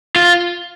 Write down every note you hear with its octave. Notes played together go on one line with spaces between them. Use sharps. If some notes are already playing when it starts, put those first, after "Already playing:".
F4